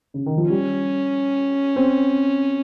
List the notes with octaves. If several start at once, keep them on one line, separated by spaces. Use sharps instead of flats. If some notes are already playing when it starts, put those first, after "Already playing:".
C#3
D#3
F3
G3 C#4
C4